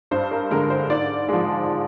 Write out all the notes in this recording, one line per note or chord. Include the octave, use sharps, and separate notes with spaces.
G2 C5
A#4
D3 G#3 A#4
C5
G#2 D5
F3 G#3